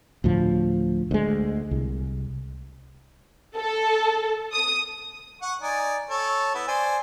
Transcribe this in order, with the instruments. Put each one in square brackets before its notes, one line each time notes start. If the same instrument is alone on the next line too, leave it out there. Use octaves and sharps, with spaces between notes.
[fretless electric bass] D2 A2 F3
D2 G#3
C2
[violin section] A4
D#6
[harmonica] F#5 C#6
D#4 D5 G#5
A4 C#5
B3 E4
C5 D5 G#5